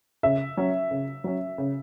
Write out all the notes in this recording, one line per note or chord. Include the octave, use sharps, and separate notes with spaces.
C#3 E5
F#3 C#4
C#3
F#3 C#4
C#3